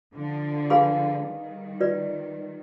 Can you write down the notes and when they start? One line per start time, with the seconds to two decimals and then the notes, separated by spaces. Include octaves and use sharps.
0.15 D3 F3
0.70 G#4 B4 F5 G#5 B5
1.25 D#3 G3
1.80 F4 B4 D5